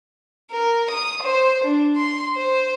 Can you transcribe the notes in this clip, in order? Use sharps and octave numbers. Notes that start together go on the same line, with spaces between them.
A#4
D#6
C5
D4
C6
C5